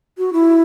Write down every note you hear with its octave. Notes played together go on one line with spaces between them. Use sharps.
F#4
E4